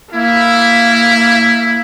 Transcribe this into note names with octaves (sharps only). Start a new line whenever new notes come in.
A#3 E4